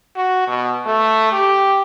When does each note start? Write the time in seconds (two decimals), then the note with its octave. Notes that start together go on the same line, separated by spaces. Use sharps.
0.16 F#4
0.48 B2
0.86 A3
1.32 G4